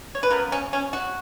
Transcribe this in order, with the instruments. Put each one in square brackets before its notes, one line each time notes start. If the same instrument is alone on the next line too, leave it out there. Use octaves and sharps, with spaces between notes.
[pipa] C#5
B4
C#3 F3 B3 A#4
C#4
C#4
F#4